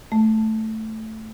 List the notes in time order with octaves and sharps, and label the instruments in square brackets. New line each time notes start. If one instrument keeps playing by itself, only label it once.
[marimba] A3